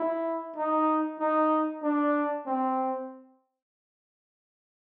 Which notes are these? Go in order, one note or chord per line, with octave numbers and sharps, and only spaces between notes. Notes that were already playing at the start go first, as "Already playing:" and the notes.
Already playing: E4
D#4
D#4
D4
C4